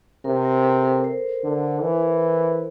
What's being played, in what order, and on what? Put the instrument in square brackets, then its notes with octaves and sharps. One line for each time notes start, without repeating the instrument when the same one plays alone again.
[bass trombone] C3 [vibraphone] A#4
[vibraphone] A#4
A4
A#4
C5
[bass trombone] D3
E3